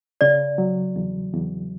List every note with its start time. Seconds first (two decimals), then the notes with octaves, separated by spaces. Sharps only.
0.21 C#3 D5
0.58 F#3
0.96 E2
1.34 E2